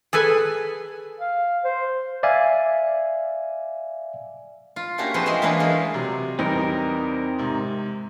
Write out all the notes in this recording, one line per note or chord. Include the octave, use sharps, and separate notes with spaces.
G#4 A4 B4 G#5
F5
C5
D5 E5 F5 G#5
F4
A3 A#3 C#4 D4 F#4 G4
F3 C4 F#4 G#4 B4 C5
F2 G#3 E5 A#5 C6
E3 A#3 B3 C#4 D4 E4
G#3 A3 F4 G#4 A#4
C3 F#3
E2 G3 C4 D#4 A#4
G#2 C3